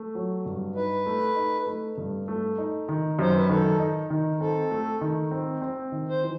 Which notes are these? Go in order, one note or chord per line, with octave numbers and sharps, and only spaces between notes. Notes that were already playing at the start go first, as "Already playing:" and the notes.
Already playing: A3
F#3
G2
D#4 B4
A3
D#4
A3
G2
A3
D#4
D#3
F#2 C5
B4
D#3 A4
D#4
D#3
C4 A4
A3
D#3
C4
C4
D#3
C5
E3